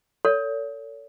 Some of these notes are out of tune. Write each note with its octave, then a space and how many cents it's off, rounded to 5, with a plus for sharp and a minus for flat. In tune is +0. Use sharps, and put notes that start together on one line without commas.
A4 +30 C#5 +40